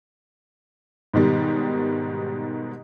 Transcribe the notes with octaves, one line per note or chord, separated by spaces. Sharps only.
G#2 B2 D#3 G3